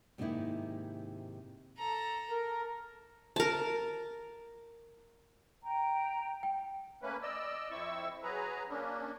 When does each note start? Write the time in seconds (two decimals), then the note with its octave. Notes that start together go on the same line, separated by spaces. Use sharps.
0.18 G#2 C3 D#3 A#3 D#4 E4
1.77 A4 A#5
2.31 A#4
3.36 A#4 A5
5.63 G5 A#5
6.43 G5
7.03 A3 A#3 C#4 B4
7.22 D5 D#5 E6
7.71 F2 C4 E4 C#6 E6
8.23 F#3 G#4 B4 A#5
8.69 A#3 C#4 D4